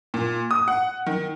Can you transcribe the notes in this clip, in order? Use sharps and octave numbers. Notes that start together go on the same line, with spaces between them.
A#2
D#6
F#5
D#3